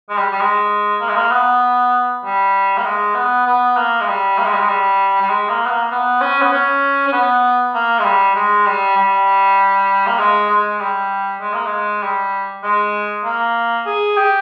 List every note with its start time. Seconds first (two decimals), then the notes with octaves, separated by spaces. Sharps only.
0.09 G#3
0.17 G3
0.32 G3
0.41 G#3
1.01 A#3
1.09 G#3
1.16 A#3
1.31 B3
2.24 G3
2.77 A#3
2.86 G#3
3.15 B3
3.46 B3
3.77 A#3
4.01 G#3
4.08 G3
4.38 A#3
4.45 G#3
4.53 G3
4.60 G#3
4.69 G3
5.21 G3
5.29 G#3
5.49 A#3
5.66 B3
5.71 A#3
5.91 B3
6.21 C#4
6.41 B3
6.52 C#4
7.07 C#4
7.13 B3
7.74 A#3
7.99 G#3
8.04 G3
8.35 G#3
8.66 G3
8.97 G3
10.07 A#3
10.19 G#3
10.50 G#3
10.80 G3
11.41 G#3
11.54 A#3
11.66 G#3
12.02 G3
12.63 G#3
13.24 A#3
13.86 G#4
14.17 G4